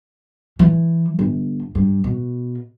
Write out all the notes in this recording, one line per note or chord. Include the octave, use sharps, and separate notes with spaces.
E3
G1
G2
B2